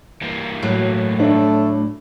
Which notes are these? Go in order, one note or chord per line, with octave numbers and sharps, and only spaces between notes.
G2 E3 A#3
A2 F#3
A3 D4